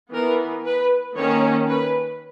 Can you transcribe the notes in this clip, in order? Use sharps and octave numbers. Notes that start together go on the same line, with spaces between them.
E3 B3 A#4
B4
D#3 A#3 C#4 C#5
B4